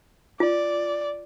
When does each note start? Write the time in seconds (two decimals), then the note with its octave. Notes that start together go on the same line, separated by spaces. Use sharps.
0.40 F4 D5